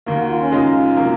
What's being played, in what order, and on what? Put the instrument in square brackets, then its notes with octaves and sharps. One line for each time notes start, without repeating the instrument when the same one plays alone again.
[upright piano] D#2 D#3 A#3
[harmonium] F#4
F4
C#4
[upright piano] F#2 C#3 G#3 D#4 [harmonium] F4
[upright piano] C3 F#3 A#3